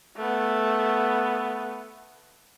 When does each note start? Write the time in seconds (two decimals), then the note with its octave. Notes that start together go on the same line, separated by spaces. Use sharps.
0.16 A3 B3